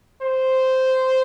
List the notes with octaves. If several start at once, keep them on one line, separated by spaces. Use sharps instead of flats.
C5